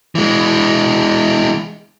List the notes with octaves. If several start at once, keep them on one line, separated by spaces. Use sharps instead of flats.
E3 G#3